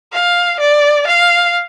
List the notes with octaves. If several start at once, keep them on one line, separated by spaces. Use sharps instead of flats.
F5
D5
F5